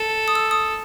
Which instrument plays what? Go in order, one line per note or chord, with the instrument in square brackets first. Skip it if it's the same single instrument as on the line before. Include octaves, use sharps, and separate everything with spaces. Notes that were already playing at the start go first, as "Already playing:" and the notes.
Already playing: [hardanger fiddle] A4
[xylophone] D#6
E6
D#6